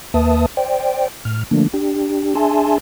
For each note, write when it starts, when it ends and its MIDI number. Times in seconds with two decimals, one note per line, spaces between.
0.14 0.46 39
0.14 0.46 58
0.14 0.46 71
0.14 0.46 76
0.14 0.46 81
0.14 0.46 87
0.57 1.08 72
0.57 1.08 74
0.57 1.08 79
1.25 1.44 45
1.25 1.44 89
1.51 1.68 50
1.51 1.68 53
1.51 1.68 57
1.51 1.68 58
1.51 1.68 62
1.74 2.35 62
1.74 2.35 67
2.35 2.78 62
2.35 2.78 68
2.35 2.78 76
2.35 2.78 80
2.35 2.78 81
2.35 2.78 84